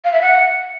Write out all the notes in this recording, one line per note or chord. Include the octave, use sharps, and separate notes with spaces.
F5
E5
F#5